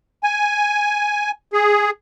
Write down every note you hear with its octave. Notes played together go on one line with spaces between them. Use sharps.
G#5
G#4